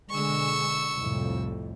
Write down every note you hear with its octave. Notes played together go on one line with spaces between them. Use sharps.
B2 D3 G#3 C#6 E6
C2 F2 A2